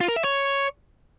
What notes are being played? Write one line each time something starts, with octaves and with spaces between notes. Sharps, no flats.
F4
A#4
E5
C#5